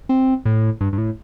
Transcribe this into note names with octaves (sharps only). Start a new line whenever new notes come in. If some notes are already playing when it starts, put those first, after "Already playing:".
C4
A2
G2
G2
A2